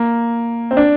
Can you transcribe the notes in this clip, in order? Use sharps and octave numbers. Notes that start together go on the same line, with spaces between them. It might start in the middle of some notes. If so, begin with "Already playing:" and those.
Already playing: A#3
C4
D4